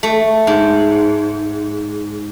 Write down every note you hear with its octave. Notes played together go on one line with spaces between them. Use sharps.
A3
G#2